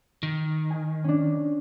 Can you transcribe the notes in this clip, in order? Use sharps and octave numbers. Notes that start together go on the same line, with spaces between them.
D#3
G#5
C#4 D4